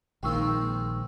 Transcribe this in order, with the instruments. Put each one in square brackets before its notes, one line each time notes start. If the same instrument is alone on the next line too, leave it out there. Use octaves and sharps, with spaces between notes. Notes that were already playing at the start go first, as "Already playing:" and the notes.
[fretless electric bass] A#1 D#3 [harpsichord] G#3 A#3 C4 [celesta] G5 C#6 E6